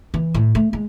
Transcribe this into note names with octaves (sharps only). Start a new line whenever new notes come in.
E3
A2
A3
G#3